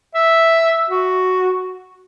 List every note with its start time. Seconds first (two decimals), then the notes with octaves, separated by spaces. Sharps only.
0.15 E5
0.90 F#4